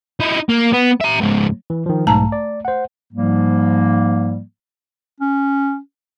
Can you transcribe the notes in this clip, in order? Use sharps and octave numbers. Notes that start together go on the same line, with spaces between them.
D#4 E4
A#3
B3
E5 A#5
C#2 G#2
E3
D#3 F3
B1 G#2 A3 A5 A#5
D5
C5 F#5
G#2 F3 G3 A#3
C#4